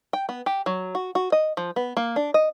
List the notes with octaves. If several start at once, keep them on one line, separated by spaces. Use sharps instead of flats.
G5
B3
G4
F#3
F#4
F#4
D#5
F3
B3
A#3
D4
D#5